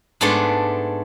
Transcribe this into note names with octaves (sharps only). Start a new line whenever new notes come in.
G#2 A3 B3 D4 D5 C6